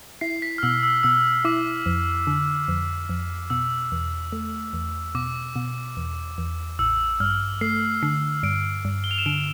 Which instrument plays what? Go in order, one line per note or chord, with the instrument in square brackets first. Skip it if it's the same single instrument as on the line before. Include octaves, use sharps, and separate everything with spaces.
[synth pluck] E4 [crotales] C7
[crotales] B6
F6
[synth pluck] B2 [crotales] E6
[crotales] E6
[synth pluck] B2 [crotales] E6
[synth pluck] E4 [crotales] D6
[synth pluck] F2
D3
F2
F2
[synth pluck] B2 [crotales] E6
[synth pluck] E2
A3
E2
[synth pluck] B2 [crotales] D6
[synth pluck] B2
E2
E2
[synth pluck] A1 [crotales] E6
[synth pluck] G2 [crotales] F6
[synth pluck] A3 [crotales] C7
[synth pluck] D3 [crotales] C7
[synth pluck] G2 [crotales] D7
[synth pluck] G2
[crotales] G7
F7
E7
[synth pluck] D3 [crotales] D7